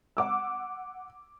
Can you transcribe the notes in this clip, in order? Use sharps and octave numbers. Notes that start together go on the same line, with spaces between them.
F#5 D6 E6